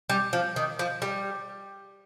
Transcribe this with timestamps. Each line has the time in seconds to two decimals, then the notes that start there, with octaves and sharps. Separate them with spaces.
0.09 G3
0.33 F3
0.56 D#3
0.79 F3
1.02 G3